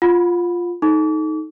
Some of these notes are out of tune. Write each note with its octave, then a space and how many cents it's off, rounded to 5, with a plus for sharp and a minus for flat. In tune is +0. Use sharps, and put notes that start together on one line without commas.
F4 +0 F#5 -35 B5 +0
D#4 +10 A4 -20 D6 -40